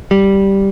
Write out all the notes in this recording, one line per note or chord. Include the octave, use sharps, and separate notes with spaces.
G3